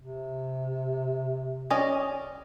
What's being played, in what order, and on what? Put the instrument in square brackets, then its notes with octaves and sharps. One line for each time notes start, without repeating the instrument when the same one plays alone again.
[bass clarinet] C3
[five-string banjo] C#4 D5 D#5